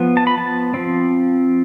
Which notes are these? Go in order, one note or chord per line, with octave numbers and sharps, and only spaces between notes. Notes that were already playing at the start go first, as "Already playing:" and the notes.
Already playing: F3 B3
A5
B5
A5
F3 C4